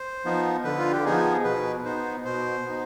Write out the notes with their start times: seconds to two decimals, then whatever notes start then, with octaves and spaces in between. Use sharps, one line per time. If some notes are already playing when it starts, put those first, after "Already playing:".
Already playing: C5
0.25 F3 B3 D#4
0.64 D3 B4
0.79 F4
0.92 G4
1.05 F3 B3 D#4 G#4
1.44 B2 B4
1.85 B3 D#4 C5
2.25 B2 C5
2.65 B3 D#4